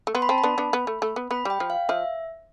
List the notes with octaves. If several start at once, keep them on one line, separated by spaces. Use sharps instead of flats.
A3
B3 C6
B5
C4 A5
B5
B3 D4
B3 D4
B3
A3
A3
B3
B3 B5
G3 G5
F3
F5
F3 E5